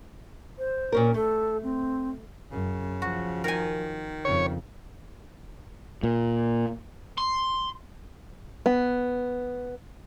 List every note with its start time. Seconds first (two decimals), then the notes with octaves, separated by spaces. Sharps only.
0.58 C5
0.92 A#2 C#4 A#4
1.14 A3 A4
1.63 C4
2.52 F#2 C#3
3.02 F3 F#4
3.44 D#3 A#4 G#5
4.25 F2 C#3 C#5
6.03 A#2
7.18 C6
8.66 B3